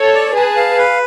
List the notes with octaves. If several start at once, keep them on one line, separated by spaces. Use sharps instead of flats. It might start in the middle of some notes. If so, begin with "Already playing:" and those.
Already playing: A4 C#5
D5
G#4 B4 A5
F5
B4